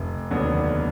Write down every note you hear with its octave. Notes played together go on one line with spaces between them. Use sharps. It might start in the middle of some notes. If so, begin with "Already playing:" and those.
Already playing: F1
D#2 D3 F#3 B3